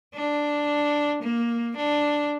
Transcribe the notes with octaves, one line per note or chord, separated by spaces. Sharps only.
D4
A#3
D4